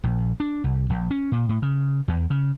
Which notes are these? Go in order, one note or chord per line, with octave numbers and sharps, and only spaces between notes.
A#1
D4
C2
A#1
C#4
A#2
A2
C#3
E2
C#3